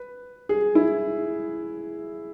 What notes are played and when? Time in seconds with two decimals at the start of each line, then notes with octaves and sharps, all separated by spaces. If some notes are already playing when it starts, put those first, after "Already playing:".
Already playing: B4
0.49 G#4
0.75 E4